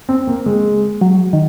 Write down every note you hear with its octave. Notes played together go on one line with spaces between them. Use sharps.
C4
A#3
G#3
F#3
D#3